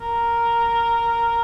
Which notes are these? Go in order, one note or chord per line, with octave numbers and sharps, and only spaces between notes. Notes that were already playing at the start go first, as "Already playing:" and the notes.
A#4